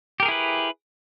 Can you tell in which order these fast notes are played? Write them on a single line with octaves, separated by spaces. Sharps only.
G4 A#4 G#4 E4 B4